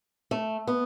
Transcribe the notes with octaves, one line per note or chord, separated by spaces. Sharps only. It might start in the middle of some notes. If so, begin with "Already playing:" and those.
A3
B3